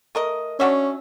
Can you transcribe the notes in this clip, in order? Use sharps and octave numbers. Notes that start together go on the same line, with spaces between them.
A3 A#4 D#5
C#4 D4 F#4 E5